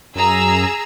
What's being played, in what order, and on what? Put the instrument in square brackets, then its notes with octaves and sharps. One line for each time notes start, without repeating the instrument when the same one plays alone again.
[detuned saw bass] F#2 [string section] G#4 A#5 E6